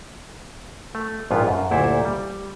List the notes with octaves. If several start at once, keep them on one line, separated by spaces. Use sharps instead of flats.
A3
A#1 F2 G#2 B3 F4
F#2
D2 A#2 E4 G4 A4 C5
G3